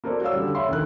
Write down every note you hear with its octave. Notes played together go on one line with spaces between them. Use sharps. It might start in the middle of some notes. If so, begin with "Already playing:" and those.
A#3 F#4 A4 C5 D5
F#4 C#5 D5 F5 E6
D3 G3
C#5 E5 F5 B5 C6
D2 D#3 F#6